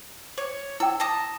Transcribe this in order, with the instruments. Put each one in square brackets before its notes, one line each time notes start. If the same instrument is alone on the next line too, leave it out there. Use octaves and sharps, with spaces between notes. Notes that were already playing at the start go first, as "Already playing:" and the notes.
[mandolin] C#5
[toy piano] E4 G5 [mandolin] E6
[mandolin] A5 A#5 D#6